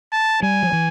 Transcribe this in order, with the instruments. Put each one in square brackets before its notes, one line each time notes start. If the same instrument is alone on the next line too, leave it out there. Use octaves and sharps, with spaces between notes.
[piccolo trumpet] A5
[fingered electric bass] G3 [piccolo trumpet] G#5
[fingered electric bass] F3
E3